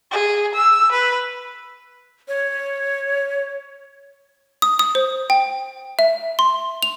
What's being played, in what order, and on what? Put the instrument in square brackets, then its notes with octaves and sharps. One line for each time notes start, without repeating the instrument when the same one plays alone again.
[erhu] G#4
E6
B4
[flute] C#5
[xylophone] D#6
D#6
C5
G5
E5
C6
F7